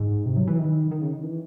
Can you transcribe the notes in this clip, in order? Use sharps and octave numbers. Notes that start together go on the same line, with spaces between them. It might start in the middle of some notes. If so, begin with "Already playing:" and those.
Already playing: G#2
C3
F#3
E3
D#3
D#3
C#3
D#3
E3